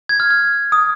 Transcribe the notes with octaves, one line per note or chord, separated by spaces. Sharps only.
G#6
F6
F6
D#6